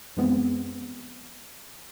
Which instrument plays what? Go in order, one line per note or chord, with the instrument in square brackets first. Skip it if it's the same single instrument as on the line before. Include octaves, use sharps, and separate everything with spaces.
[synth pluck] F#2 E3 G#3 B3 C4